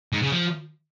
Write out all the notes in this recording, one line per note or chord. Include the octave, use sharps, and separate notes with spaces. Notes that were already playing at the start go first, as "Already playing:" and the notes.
G#2
C#3
F3